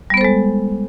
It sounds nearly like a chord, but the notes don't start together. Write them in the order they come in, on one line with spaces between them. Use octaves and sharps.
G3 B3 C5 A4 G#3